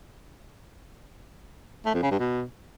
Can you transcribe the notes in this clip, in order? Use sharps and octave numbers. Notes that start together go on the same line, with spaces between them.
A3
F2
C#3
G2
B2